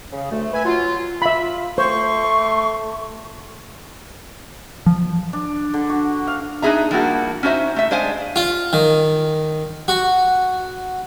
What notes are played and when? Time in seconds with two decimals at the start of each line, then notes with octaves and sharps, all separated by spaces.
0.13 C#3
0.31 D2 A3
0.53 B4 E5 G#5
0.65 F#3 F4
1.22 F4 E5 B5
1.78 A3 C5 C6 C#6
4.86 F3
5.33 D4
5.74 D3
5.89 F#4
6.27 F5
6.62 D4 D#4 F#4 G#4 E5 A#5
6.91 F3 G3 A#3 E4 F#4
7.43 C#4 D#4 F#4 C5 E5
7.76 A3 E5
7.91 G#3 D4 C5 F5 G#5
8.36 F4
8.73 D#3
9.88 F#4